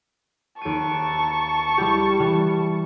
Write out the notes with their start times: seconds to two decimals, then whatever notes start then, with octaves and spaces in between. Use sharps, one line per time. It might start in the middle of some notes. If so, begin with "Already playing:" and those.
0.61 D#2 A5 C#6 D7 D#7
1.78 G3 E4 G4
2.19 E3 G3